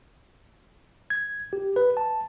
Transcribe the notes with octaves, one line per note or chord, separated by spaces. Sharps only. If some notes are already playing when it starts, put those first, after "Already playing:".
G#6
G4
B4
A5